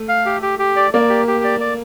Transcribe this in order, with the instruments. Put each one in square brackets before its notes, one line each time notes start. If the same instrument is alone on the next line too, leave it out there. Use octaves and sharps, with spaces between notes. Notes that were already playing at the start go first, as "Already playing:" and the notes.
Already playing: [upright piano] A3
[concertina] F5
G4
G4
G4
D5
[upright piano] A#3 [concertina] D5
[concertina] G4
G4
D5
D5